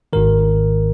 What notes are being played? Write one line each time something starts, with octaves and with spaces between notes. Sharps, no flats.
G#1 G#2 D#3 A#4